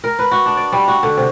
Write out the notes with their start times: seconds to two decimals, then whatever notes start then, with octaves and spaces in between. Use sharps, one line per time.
0.04 A#4
0.19 B4
0.31 F#4
0.46 D4
0.57 D5
0.72 G3
0.88 F#4
1.03 D3
1.17 C3